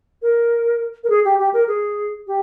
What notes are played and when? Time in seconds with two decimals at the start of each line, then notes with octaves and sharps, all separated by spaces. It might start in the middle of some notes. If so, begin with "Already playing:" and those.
0.22 A#4
1.04 A#4
1.10 G#4
1.25 G4
1.39 G4
1.53 A#4
1.68 G#4
2.27 G4